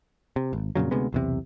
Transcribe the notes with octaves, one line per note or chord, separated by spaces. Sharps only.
C3
G#1
F2 A#2 C#3 F#3
D2 C3 G#3 B3
B1 E2 C3